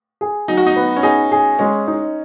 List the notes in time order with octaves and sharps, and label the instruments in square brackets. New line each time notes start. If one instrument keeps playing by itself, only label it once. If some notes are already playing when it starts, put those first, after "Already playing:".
[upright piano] G#4
[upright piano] F#3 [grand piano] D#4
[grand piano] F#4
D#4
[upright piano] B3
[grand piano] C#4
[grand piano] D#4 [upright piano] G#4
[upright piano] G#4
[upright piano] G#3 [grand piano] C#4
[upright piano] D#4